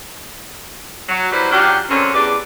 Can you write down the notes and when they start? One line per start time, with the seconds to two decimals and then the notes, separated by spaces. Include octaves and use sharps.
1.08 F#3
1.32 F#3 G3 E4 B4 C5
1.52 F#3 C#4 D4 F4 G4
1.89 F#2 D3 C4 C#4
2.14 E2 D4 G4 B4 D5